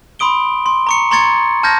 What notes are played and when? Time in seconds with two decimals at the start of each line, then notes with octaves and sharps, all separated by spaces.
0.19 B5 C6 D#6 D7 G7
0.66 C6
0.87 A#5 C#6 C#7
1.11 A#5 C6 C#6 G#6 A6 C#7
1.63 A5 F6 G6 G#6 A#6